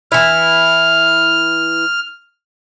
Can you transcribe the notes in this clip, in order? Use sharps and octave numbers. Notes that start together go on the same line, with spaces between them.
E3 E4 F6